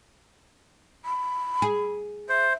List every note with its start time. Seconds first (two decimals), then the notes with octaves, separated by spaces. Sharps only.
1.05 B5
1.62 G#4
2.29 C5 E5